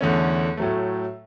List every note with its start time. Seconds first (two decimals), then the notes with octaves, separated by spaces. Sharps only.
0.01 E2 D3 A3 C#4
0.57 A2 F#3 A3